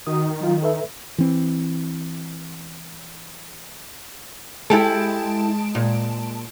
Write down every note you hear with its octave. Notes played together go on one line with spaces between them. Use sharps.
D#3 F#4 D#6
F#3 F4
A4 B4 E5
E3 C4
G#3 E4 G4 A4 A5 D7
A#2